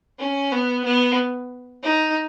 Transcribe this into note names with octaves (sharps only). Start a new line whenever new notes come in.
C#4
B3
B3
D#4